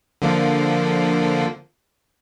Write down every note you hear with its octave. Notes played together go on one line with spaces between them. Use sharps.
D3 F3 A#3